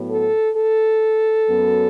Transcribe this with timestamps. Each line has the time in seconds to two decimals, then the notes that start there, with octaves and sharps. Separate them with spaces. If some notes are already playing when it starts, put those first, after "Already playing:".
Already playing: A2 F#3 B3
0.11 A4
0.56 A4
1.46 F#2 F#3 B3